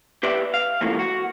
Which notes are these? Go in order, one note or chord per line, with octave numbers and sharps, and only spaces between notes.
G4 B4 D5 E5
F5
G#2 C3 E3 F3 A3 A#3
F#4